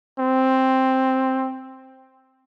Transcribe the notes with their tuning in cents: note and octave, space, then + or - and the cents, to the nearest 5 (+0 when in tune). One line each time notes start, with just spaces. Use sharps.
C4 +5